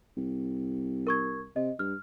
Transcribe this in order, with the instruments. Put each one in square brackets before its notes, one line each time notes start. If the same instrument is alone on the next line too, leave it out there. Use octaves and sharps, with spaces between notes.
[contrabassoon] C2
[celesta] A#4 C#6 G#6
[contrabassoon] C3 [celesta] D#5
[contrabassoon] G2 [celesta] F6